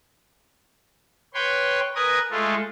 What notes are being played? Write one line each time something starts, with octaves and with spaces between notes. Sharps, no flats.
B4 C#5 G5 C6
A#4 B4 D#5 G#5 D#6
G#3 A3 F4 A4